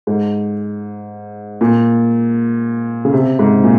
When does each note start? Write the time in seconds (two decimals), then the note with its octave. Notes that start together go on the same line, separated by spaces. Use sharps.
0.07 G#2
1.61 A#2
3.05 C#3
3.13 C3
3.39 G#2
3.64 A#2